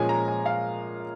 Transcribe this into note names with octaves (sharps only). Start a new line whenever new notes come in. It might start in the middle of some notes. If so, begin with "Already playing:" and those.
Already playing: A#2 F3 G#3 C#4 G#5
A#5
G#5
F5